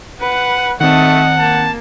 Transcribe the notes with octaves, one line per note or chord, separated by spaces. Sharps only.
B4 F#5
D#3 A3 C4 D#5 F#5 A5
A#3 A5